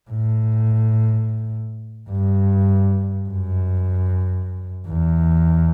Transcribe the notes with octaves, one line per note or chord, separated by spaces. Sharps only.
A2
G2
F#2
E2